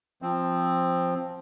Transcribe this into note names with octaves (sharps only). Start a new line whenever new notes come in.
F3 C4